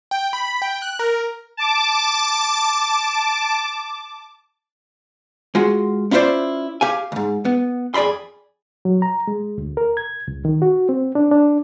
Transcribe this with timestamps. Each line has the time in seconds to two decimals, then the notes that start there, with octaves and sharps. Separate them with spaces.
0.11 G5
0.33 B5
0.62 G5
0.82 F#6
0.99 A#4
1.57 A5 D6
5.55 G#3 F4 F#4
6.11 C#4 E4 F4 G4 C5 D5
6.81 G4 F5 G#5
7.12 C#2 G#2
7.45 B3
7.94 F2 G#4 D5 B5 C6
8.85 F#3
9.02 A#5
9.27 G#3
9.58 D2
9.77 A#4
9.97 G#6
10.28 C#2
10.45 D#3
10.62 F#4
10.89 C4
11.15 D4
11.31 D4